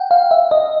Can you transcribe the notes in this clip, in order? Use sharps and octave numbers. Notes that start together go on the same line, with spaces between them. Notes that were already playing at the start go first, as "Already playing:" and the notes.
Already playing: F#5 G5
F5
E5
D#5